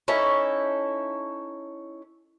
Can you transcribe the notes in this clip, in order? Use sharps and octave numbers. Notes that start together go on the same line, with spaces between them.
C#4 D#4 E4 A4